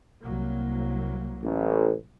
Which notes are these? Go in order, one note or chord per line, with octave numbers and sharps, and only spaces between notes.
C2 F#3 A#3
A1